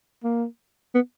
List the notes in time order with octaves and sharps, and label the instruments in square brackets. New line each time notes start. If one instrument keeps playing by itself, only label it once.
[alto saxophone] A#3
B3